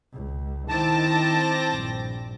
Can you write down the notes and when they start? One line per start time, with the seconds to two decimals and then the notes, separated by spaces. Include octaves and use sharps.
0.13 C#2
0.69 D#3 C4 E4 A5 D6 A#6
1.71 A#1 G2